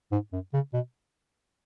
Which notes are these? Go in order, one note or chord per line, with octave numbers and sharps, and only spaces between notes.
G#2
F#2
C#3
B2